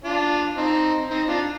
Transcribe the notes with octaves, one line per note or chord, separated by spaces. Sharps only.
D4 F4
C4 D#4
C4 D#4
D4 F4